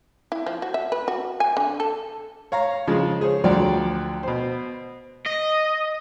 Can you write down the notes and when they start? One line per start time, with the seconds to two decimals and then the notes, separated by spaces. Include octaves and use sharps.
0.32 E4
0.46 F3
0.62 F#4
0.74 E5
0.92 B4
1.08 F#4
1.40 G#5
1.57 D3
1.80 A4
2.52 C#5 F5 A#5
2.87 C#3 F3 G#3
3.21 G#4 C5 C#5
3.44 D2 F3 F#3 D5 G5
4.23 B2 C5
5.26 D#5